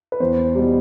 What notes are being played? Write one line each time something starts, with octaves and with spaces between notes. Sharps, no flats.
B4
E2 C5
B2 G3